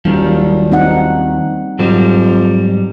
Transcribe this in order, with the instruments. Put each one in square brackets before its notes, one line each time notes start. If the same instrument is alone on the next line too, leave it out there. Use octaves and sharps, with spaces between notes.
[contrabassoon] F#1 [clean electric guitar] D#2 D#3 F3 [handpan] G3
[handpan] C4 D#4 F#5
[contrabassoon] F2 [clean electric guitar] G#2 F#3 G3